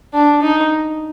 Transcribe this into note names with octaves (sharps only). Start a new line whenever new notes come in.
D4
D#4